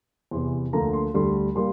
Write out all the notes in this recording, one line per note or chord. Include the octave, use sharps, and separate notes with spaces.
E2 C3 E3 C6
D2 D3 F3 A#3 A#5
C6
D2 D3 G3 C6
A#2 G3 A#3 C6